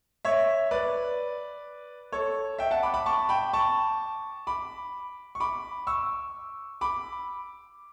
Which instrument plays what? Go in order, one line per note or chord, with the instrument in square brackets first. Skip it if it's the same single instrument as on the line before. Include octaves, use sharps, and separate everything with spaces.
[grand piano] C#5 E5
B4 D5
A4 C#5
E5 G5
F#5 A5
B5 D6
B5 D6
A5 C#6
G5 B5
A5 C#6
B5 D6
C#6
B5 D6
C#6 E6
B5 D6